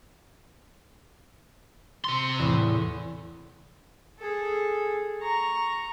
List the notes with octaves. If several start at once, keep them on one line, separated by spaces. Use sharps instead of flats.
C3 C6
E2 A2
G#4 A4
A#5 C#6